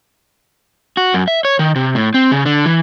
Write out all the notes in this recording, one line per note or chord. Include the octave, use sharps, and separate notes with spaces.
F#4
F#2
E5
C#5
D#3
C3
A2
C4
C#3
D3
E3